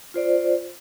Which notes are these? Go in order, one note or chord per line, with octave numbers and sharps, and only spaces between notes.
F4 C5 D5